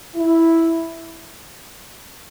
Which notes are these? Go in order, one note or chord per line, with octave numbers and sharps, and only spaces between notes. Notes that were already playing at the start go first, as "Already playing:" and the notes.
E4